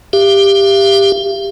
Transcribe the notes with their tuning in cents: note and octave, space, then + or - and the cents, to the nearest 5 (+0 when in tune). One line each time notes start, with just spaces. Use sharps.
G4 +15 F5 -45